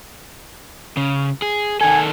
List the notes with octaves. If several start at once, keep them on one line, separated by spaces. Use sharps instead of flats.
C#3
G#4
D#3 A4 G#5